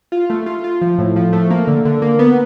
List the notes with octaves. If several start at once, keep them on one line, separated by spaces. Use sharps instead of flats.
F4
A3
F4
F4
F3
A2
F3
A3
A#3
D3
D3
A#3
B3